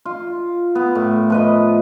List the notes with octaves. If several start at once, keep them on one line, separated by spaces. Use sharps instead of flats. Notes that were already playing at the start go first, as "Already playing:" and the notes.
F4
B3
A2
F3 B4 D#5